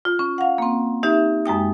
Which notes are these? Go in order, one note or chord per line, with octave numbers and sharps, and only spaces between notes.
F4
C#4
F5 F#5
A#3 C4
D#4 G4 E5
F#2 G#3 G5 D#6